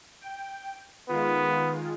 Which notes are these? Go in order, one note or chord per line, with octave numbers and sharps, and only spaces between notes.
G5
D#3 G#3 B3 F4